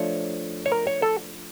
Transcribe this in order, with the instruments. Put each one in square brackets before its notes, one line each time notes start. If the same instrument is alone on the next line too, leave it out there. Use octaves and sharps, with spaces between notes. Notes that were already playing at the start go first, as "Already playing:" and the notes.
Already playing: [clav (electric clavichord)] F3 A3 D4 C#5
C#5
A#4
C#5
A4